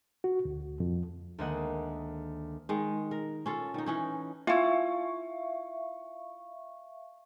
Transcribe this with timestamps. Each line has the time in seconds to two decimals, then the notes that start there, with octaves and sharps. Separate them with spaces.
0.24 F#4
0.45 D2
0.80 F2
1.38 D2 D#3 G#3 A#3 D#5 F#5
2.69 D#3 G#3
3.11 A#4
3.46 C#4 F4 A4
3.74 D#3 D#4
3.86 E3 C#4 D#4
4.47 E4 F4 E5 F5 C#6